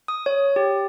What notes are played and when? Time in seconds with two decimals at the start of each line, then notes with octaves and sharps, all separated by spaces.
0.08 D#6
0.26 C#5
0.56 G4